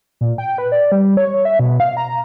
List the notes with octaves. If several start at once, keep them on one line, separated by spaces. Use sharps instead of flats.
A#2
G5
B4
D5
G3
C#5
E5
B2
F5
A#5